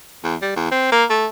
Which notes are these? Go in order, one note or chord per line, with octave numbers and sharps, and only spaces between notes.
E2
G3
E2
C4
A#3
A3